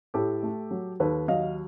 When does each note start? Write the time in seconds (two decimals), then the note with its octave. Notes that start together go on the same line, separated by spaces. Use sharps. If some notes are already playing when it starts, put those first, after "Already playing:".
0.14 A2 G4 A4
0.43 A3
0.71 F#3
1.00 D#2 A4 B4
1.28 F#3 D#5 F5